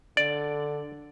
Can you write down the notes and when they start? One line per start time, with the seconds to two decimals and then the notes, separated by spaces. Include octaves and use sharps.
0.17 D3 D5